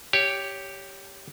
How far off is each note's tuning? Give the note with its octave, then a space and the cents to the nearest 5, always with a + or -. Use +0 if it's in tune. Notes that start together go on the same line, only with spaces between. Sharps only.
G4 +0 C#5 +10 F5 -20